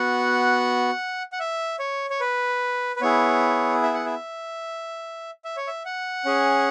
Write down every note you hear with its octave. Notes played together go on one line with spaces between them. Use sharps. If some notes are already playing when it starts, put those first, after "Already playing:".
Already playing: B3 F#4 F#5
F#5
E5
C#5
C#5
B4
B4
B3 E4 G#4 C#5
E5
F#5
E5
E5
C#5
E5
F#5
C#4 G#4